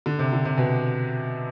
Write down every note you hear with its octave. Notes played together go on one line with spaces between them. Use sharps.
D3
C3
D3
C3
B2